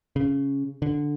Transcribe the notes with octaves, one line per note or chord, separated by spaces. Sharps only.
C#3
D3